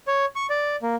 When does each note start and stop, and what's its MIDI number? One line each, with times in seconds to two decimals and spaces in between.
0.08 0.25 73
0.36 0.47 85
0.50 0.76 74
0.83 0.96 58